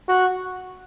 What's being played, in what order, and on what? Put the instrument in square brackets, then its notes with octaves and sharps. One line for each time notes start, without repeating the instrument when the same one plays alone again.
[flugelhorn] F#4